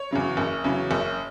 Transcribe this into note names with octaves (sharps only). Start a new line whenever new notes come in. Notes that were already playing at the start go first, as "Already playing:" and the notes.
Already playing: C#5
E2 C#3 F#3
F#1
E2 C#3 F#3
F#1